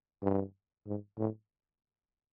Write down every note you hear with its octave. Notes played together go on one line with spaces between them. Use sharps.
G2
G#2
A2